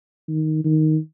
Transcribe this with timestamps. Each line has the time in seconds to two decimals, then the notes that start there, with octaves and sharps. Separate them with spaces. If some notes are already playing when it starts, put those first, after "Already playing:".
0.28 D#3
0.64 D#3